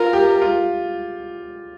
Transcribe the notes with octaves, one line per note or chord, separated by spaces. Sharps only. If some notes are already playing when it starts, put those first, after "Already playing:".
Already playing: F4 A#4
G4
F4